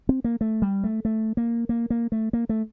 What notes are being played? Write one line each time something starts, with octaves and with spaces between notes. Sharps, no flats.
C4
A#3
A3
G3
A3
A3
A#3
A#3
A#3
A3
A#3
A3